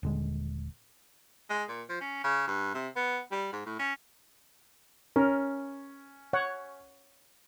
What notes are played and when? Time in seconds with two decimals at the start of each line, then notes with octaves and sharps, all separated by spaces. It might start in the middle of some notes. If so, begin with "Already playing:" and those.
0.03 D#1 D3 G#3
1.50 G#3
1.69 A#2
1.89 F3
2.01 C#4
2.24 C#3
2.48 G2
2.74 C3
2.96 B3
3.32 G3
3.53 G#2
3.66 A2
3.79 C#4
5.16 C#4 A#4
6.33 C#5 F#5